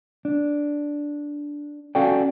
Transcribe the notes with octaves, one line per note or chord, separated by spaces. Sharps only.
D4
C#4 F#4 A4 D5 F5 G5